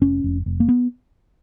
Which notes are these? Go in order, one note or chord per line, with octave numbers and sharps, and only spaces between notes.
F1 C#4
F1
F1
A#3
B3